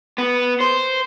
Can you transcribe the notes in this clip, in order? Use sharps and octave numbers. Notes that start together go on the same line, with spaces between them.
B3
C5